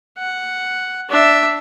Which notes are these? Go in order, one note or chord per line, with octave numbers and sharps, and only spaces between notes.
F#5
D4 E5